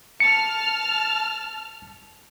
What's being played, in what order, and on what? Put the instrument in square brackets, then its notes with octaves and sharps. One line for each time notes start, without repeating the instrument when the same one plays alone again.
[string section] A5 F6 [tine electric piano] C#7